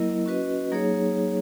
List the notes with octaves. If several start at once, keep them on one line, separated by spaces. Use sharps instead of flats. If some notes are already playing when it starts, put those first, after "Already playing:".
Already playing: F#3 A#3 E4 A#4 D#5
C#4 F#4 B4 D#5
F#3 A#3 D#4 G#4 C#5